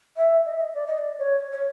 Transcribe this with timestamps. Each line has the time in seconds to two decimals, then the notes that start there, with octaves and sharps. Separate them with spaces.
0.17 E5
0.46 D#5
0.53 E5
0.60 D#5
0.74 D5
0.87 D#5
0.98 D5
1.19 C#5
1.51 C#5